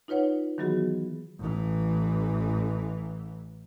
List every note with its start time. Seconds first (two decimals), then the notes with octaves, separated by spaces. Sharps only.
0.08 D#4 F4 B4 C#5 F#5
0.58 D#3 E3 F#3 B3 F#4 G#4
1.39 A1 E3